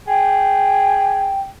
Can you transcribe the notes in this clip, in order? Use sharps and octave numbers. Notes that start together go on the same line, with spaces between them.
G#4 G5